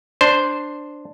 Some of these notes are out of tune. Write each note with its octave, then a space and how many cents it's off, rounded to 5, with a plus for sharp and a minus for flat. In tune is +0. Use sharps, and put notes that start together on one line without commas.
D4 +5 C5 +0